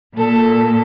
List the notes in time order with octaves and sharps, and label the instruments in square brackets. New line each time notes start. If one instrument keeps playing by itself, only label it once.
[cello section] A#2 [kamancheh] A4